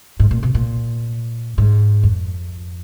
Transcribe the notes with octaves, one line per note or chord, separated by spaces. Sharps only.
G#2
A#2
B2
A#2
G#2
F2